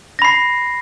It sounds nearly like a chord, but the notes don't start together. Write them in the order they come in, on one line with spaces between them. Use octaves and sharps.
A#6 B5 C7